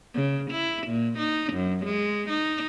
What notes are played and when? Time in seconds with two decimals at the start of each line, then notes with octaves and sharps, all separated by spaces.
0.14 C#3
0.51 E4
0.87 A#2
1.18 D#4
1.53 F#2
1.85 G#3
2.29 D#4